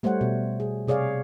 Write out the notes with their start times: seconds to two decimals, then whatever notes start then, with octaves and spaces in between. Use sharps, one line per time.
0.03 G3 A3 C5 C#5 F#5
0.21 B2
0.60 G#4
0.88 C3 G#4 C#5 D5 F5